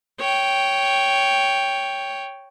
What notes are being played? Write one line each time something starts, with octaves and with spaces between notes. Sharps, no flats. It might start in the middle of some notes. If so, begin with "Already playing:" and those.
C#5 G5